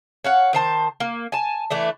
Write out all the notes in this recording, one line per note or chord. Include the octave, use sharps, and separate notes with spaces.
C#5 F5 F#5
D#3 C5 A5
A#3
G#5 A5
E3 A3 D4